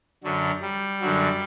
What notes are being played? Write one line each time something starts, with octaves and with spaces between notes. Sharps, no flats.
F#2 D3 F#3
G3
F#2 D3 F#3